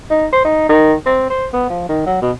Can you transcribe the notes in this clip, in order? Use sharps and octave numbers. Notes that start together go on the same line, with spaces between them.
D#4
C5
D#4
D#3
C4
C5
B3
F3
D#3
F#3
B2